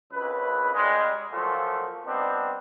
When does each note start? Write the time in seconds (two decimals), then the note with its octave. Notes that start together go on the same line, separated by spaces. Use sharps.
0.12 G#1 C#2 C#3 B4
0.74 C#3 G3 G#3
1.31 A#2 F3 F#3 A3 F4
2.05 G3 B3 C4 D4 D#4